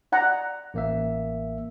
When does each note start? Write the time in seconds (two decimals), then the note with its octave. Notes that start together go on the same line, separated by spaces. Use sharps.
0.12 D5 F#5 A#5
0.74 A1 A#3 E5